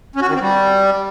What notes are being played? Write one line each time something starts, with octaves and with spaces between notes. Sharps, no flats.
C#4
F#4
D#3
C4
G3